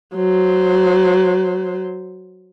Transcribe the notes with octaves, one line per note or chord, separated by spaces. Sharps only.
F#3 C5